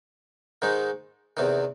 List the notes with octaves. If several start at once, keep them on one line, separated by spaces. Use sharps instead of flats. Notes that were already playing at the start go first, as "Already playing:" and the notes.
G#2 D#3 G#3 D#4
E2 C3 D#3